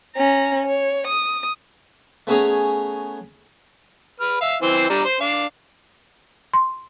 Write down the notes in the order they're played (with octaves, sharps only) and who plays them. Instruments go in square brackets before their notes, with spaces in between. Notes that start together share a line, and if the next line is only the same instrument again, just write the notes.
[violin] C#4 A#5
C#5
D#6
[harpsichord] A3 B3 C#4 G#4 C#5 A#5
[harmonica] B4 F6
E5 F5
E3 C4 C5
G3 D4 A#5
C5
D4 F5
[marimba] C6